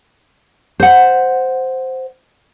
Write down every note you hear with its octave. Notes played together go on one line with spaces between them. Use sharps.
C5 F#5